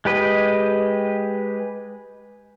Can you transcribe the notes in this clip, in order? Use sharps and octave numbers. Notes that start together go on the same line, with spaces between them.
G#3 G4 B4 D#5